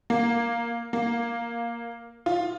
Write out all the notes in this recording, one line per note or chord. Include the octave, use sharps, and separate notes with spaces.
A#3
A#3
F4